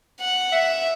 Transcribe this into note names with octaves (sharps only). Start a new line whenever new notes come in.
F#5
E5